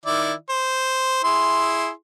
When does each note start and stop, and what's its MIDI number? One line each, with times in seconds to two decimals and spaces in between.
0.06 0.33 51
0.06 0.33 64
0.06 0.33 74
0.49 1.24 72
1.24 1.89 64
1.24 1.89 68
1.24 1.89 84